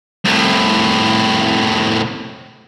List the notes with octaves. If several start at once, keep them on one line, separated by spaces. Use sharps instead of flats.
C2 A2